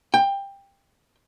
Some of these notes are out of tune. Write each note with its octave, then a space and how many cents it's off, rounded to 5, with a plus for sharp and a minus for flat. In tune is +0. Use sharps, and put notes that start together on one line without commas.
G5 +15